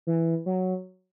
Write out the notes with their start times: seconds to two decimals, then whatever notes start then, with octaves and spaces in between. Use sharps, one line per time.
0.07 E3
0.46 F#3